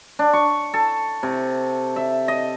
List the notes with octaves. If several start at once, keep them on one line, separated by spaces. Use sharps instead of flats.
D4
C#6
A4
C3
E5
D#5